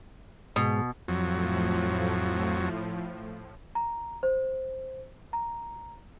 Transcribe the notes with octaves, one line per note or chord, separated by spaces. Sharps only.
G#2 B2
F2 A2 F3 F#3
A#5
C5
A#5